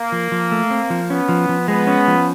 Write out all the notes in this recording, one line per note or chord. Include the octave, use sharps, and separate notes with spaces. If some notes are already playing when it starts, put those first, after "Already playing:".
Already playing: A#3
F3
F3
A3
C4
F3
B3 C#4
F3
F3
G#3 B3
C#4
F3